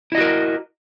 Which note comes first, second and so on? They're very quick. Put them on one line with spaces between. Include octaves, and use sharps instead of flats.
E4 D#5 F#4 A#4